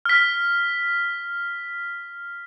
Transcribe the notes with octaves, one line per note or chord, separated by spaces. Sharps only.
F6 B6